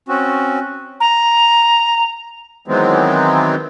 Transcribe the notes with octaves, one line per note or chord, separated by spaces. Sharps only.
C4 C#4 F#4
A#5
D#3 E3 F#3 G#3 B3 C4